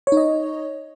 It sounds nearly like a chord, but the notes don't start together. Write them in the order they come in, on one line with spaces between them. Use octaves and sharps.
C#5 D#4 D#5